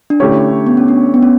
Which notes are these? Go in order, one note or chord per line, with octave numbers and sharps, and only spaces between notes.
D4
D3 A3 C#4 E4 G4 C#5
B3
C#4
D4
B3
C#4